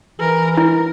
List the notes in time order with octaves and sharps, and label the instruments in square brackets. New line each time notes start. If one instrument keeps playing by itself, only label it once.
[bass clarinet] E3 [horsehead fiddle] A#4
[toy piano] E4 [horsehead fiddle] A#4